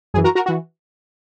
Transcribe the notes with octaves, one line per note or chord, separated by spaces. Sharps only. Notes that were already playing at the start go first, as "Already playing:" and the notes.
F#2 E3 G#4
F#4 A#4
F#4 A#4
E3 F#4